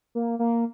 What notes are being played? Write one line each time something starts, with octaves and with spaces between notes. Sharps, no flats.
A#3
A#3